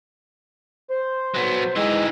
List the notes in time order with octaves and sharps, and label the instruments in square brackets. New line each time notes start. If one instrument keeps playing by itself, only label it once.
[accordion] C5
[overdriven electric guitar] F#3 B3
[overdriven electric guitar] E3 D#4 [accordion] G#3